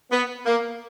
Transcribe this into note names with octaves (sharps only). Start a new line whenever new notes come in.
B3
A#3